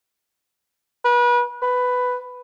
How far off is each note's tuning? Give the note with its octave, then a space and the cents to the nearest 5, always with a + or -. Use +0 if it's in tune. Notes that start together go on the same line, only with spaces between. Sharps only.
B4 -35
B4 +10